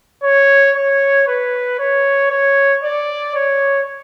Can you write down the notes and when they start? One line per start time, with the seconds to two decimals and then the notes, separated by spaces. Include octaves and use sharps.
0.24 C#5
0.76 C#5
1.28 B4
1.79 C#5
2.31 C#5
2.83 D5
3.35 C#5